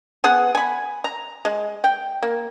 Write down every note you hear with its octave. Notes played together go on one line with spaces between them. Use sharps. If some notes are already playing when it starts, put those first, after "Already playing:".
B3 G#4 F#5
G#5 B5
A#5
G#3
G5
A#3